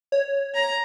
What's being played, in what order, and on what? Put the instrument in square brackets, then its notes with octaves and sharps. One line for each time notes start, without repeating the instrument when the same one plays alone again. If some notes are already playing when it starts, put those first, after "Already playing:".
[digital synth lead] C#5
[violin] A#5